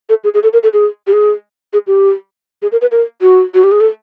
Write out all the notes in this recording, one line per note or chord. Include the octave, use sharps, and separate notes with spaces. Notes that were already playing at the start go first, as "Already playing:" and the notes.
A4
G#4
G#4
A4
A#4
A4
G#4
G4
G#4
G#4
G4
G#4
A#4
B4
A#4
F#4
F#4
G4
G#4
A4